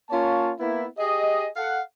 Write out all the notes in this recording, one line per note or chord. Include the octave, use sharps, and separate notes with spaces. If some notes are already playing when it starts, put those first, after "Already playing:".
A#3 C#4 F4 C#5 A5
A#3 B3 E4
G4 G#4 D#5
A4 F5 F#5